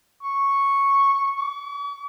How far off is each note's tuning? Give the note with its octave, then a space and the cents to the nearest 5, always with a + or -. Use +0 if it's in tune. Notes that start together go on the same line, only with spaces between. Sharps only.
C#6 -5
C#6 +45